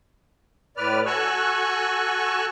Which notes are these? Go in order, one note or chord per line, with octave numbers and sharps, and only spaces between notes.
A2 B4 D5 F6
F#4 A4 G#5 C#6 E6 F#6